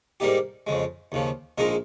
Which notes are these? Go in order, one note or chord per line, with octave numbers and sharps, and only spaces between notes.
G#2 G3 A#3 D#4 G4
F2 C#3 G#3
D#2 C#3 F3
A#1 A#2 G#3 D#4 A#4